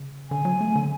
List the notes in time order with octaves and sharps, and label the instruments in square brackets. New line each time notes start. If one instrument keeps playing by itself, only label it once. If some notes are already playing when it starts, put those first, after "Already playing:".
Already playing: [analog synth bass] C#3
[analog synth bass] D3 [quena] G#5
[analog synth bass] F#3
A3
D3